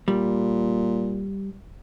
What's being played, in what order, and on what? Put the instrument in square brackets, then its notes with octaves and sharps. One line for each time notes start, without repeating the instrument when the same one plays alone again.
[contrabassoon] A#2 [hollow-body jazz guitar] G3